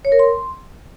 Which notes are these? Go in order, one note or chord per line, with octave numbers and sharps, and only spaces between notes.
C#5
A#4
C6